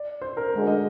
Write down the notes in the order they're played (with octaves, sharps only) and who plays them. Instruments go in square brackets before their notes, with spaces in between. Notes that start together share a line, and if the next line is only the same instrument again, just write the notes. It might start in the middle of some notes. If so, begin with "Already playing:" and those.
Already playing: [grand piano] D5
C5
A#4
[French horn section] D2 D3 G#3
[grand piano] D#5